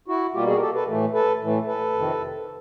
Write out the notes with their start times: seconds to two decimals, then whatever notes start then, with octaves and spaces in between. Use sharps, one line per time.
0.08 E4 F#4
0.34 B2 G3 A#3 F4 G4
0.47 F#4 G#4
0.56 A#4
0.61 G4 A4
0.75 A4 B4
0.87 A2 E3 A3
1.13 A4 B4
1.41 A2 E3 A3
1.67 A4 B4
1.93 F2 C3 D#3